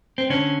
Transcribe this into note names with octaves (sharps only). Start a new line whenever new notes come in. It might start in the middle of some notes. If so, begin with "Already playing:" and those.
C4
D3 C#4